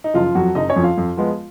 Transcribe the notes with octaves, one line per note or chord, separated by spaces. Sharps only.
D#4
F#1 F3 F4
F2 F3 F#3 F#4
F#1 D#4 D#5
C#4 C#5
F2 F3
F4 F5
F2
F3 G#3 B3